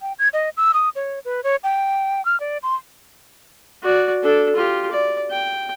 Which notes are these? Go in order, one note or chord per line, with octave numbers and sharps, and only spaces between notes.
G5
G#6
D#5
E6
D#6
C#5
B4
C#5
G5
F6
D5
C6
F#4 D5
D4 A4
F4 G4
D5
G5